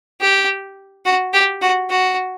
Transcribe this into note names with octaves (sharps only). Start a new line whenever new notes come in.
G4
F#4
G4
F#4
F#4